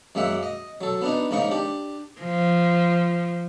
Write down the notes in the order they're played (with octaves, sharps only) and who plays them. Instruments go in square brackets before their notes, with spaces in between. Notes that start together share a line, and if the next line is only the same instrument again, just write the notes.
[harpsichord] F#2 G#3 A#3 E5 F#5
D#5
F#3 A4
B3 D4 D#4
G#2 C#3 A#3 D#4 C#6
D4 G4
[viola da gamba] F3